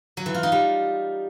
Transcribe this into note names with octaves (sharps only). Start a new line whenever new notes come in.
F#3
E3
F4
D#4
G3